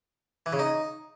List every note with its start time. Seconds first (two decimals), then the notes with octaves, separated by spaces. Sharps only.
0.46 E3
0.53 C#3
0.59 D#4